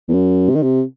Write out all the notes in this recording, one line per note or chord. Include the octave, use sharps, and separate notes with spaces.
E2
F#2
C3
D#3
C3